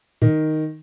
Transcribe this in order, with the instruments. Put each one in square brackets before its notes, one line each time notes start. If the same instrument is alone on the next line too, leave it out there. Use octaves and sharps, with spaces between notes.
[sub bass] A#2 [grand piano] D#3